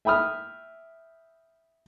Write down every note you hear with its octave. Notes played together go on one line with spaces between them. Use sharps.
E5 G5 B5 D#6 F6